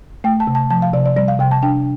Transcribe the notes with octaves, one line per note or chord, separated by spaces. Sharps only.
A3 G5
A5
C3
A5
F3 A5
F5
C3 D5
D5
G3 D5
F5
C3 G5
A5
D4 G5